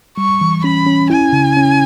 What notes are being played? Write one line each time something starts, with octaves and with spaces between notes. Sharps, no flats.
G3 C#6
E3
C#4 B5
C#4
E4 G#5
C#3
C#4